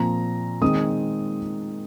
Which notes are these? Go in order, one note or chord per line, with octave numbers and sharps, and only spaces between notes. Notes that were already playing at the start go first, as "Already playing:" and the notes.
Already playing: A#2 F3 C4 A#5
D#3 G#3 C4 D#6